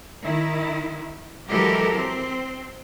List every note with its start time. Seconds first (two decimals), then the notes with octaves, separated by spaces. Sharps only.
0.23 D#3 E4
1.49 E3 F#3 G#3 G4 A4 A#4
1.97 C4